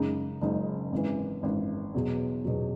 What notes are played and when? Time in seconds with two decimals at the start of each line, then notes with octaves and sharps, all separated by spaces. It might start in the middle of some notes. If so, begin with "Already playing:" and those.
Already playing: F#1 F#2 C#3 G#3 D#4
0.42 F#1 F#2 C#3 G#3 D#4
0.92 G#1 F#2 E3
1.43 G#1 F#2 E3
1.94 E2 B2 F#3
2.45 E2 B2 F#3